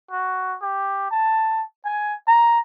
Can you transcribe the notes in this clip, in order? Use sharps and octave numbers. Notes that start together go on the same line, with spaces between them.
F#4
G4
A5
G#5
A#5